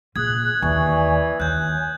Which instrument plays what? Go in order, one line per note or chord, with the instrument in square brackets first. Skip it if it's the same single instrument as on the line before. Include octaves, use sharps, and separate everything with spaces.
[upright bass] A#2 [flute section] G#4 F#6 [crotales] D#6 G#6
[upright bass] D#2 [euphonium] E3 [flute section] D5 G#5 C#6
[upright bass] D#2 [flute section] C#5 G#5 [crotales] F#6 G6